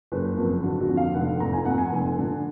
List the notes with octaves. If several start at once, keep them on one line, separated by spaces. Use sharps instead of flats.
F#1 B4
F2 A#4
D3 F#4
F#4
F2
F5
F1 F#5
F1 A#5
G#5
F2 F#5
G#5
F1
D3